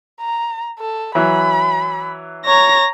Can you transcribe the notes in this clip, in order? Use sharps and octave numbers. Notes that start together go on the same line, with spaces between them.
A#5
A4
E3 F#3 B5
C#5 A#5 A#6